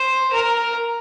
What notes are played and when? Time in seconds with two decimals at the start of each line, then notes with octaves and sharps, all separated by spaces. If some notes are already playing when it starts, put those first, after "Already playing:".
Already playing: C5
0.33 A#4